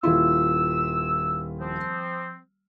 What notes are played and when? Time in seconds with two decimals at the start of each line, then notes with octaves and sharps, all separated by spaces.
0.03 D#1 E4 F4 E6
1.59 F3 C4